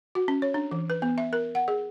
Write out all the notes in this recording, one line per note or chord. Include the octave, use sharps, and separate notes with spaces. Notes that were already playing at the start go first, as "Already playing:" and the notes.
F#4
C#4
C#5
D4
E3
B4
B3
E5
A#4
F#5
G#4